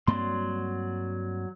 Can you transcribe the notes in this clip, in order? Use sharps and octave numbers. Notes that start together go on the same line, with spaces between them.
G2 F#3 A#3 C4 D5 C6